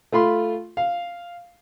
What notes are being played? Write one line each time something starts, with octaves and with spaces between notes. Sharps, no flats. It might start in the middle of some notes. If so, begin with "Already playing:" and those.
A3 F4 B5 C6
F5